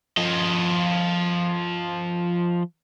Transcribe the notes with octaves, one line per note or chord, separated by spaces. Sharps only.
F3 D#5